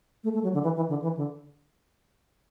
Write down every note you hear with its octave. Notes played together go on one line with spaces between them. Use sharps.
A3
A3
F#3
D3
E3
E3
D3
E3
D3